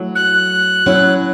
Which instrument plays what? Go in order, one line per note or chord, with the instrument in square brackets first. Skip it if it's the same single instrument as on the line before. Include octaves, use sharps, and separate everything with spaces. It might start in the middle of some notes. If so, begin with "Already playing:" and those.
Already playing: [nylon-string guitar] F#3 A3 E4
[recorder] F#6
[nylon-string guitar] F#3 C#4 E4